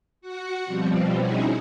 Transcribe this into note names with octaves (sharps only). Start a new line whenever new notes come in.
F#4 F#5
B2 F3 G3 C4
C#4 D#4 E4 F#4 G#4